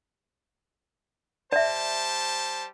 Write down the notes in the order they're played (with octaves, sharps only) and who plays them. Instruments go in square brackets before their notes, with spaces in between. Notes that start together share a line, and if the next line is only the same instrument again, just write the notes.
[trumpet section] G3 C5 A5 [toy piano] D5 E5